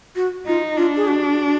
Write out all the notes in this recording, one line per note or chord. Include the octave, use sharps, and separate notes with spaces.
F#4
D#4 F4
D4 F4
G#4
F#4